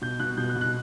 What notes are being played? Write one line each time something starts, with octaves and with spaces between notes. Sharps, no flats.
B2 G6
B2 F#6
B2 G6
F#6
B2
F#6